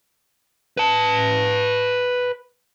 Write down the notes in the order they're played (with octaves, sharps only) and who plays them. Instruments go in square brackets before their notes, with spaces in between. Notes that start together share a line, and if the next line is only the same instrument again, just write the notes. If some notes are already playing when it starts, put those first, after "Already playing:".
[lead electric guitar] B4 A5